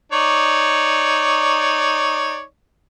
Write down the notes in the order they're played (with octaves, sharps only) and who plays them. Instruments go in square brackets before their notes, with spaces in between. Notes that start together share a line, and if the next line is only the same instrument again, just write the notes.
[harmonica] D#4 C#5 D5